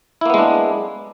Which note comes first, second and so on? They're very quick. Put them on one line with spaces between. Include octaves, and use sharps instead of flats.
E4 A#3 B3 G#3 D4